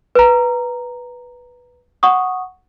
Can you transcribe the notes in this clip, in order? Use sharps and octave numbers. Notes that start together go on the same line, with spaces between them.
B4 A#5
F#5 C#6 D#6